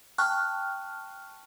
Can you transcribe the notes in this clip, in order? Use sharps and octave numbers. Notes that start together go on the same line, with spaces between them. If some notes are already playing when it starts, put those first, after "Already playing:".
G5 A5 C#6 F6 F#6